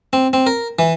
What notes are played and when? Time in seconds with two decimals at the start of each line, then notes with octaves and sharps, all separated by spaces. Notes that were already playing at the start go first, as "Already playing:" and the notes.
0.13 C4
0.33 C4
0.47 A#4
0.79 E3